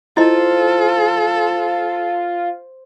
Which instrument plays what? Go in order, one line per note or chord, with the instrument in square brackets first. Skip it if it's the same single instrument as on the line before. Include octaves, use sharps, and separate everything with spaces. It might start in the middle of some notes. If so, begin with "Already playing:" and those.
[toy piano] E4 D#5 [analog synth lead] F4 [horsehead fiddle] A4 [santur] C5